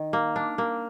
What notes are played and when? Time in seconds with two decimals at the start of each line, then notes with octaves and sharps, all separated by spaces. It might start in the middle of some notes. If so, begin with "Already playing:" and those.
Already playing: D#3
0.13 A#3
0.36 D4
0.58 A#3